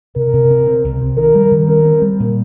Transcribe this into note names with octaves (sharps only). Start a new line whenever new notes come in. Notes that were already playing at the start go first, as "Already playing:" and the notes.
C3 A#4
C3
C3
C4
C2
C3
D#3 A#4
G3
D#3
C4 A#4
C4
G3
A#2